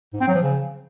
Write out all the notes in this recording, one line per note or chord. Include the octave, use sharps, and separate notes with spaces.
G#2
C4
F#3
F3
C#3